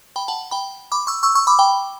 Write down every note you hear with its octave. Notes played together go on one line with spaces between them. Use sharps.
G5 B5
F#5 A5
G5 B5
B5 D6
C#6 E6
C#6 E6
C#6 E6
B5 D6
G5 B5